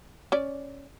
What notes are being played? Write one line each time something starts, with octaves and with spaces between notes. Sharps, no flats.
C#4 D5